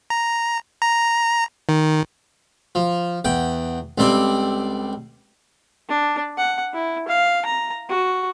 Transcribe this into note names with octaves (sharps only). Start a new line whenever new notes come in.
A#5
A#5
D#3
F3
E2 F#5 G5
C#2 G3 C4 A4 D5
D4
F#5
E4
F5
A#5
F#4